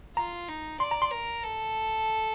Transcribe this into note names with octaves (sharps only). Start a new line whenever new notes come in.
F4 A#5
D#4
D5 C6
A#5
C6
A#4
A4